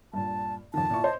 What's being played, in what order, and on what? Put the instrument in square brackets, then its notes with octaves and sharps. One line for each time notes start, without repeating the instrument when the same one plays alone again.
[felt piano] G2 A#2 [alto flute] A5
[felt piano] F2 D#3 [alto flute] A5
[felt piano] A#2 E4 C#6
C5 D#5